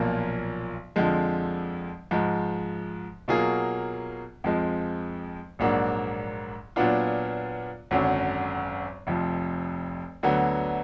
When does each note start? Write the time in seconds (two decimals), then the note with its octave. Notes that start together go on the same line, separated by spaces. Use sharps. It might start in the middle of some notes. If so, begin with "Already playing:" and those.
Already playing: B1 A#2 F3 A#3 F4
0.96 F2 D3 F3 G#3
2.11 G#2 F3 G#3
3.28 B2 F#3 A#3 F4 G#4
4.44 F2 F3 G#3
5.59 A#1 G#2 F#3 A#3 D4
6.76 A#2 F#3 B3 D4 F4
7.91 G#1 F#2 D3 F#3
9.07 F1 F2 F3
10.23 D2 D3 F#3 B3